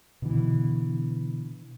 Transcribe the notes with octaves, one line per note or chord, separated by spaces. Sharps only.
B2 D3 E3